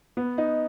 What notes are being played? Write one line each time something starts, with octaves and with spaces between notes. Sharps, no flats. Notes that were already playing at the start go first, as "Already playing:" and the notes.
B3
D#4